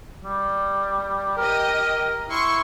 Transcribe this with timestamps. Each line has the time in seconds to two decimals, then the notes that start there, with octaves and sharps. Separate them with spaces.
0.23 G3
1.37 G4 A#4 D#5
2.30 E4 C6 C#6